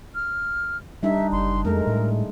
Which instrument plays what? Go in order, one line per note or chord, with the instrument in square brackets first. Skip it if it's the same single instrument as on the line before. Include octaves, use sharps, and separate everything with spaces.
[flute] F6
[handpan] G3 D4 D#4 [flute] E5
[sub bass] F#1 [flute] C6
[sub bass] F2 [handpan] G#3 A3 [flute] A#4
[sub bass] A2